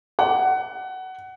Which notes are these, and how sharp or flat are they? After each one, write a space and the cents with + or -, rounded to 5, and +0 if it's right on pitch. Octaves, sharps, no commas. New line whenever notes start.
F#5 +20